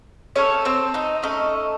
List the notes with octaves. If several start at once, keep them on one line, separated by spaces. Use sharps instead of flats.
A3 C#4 A4 C#5
C4 C5
D#4 D#5
A3 C#4 D#4 A4 D#5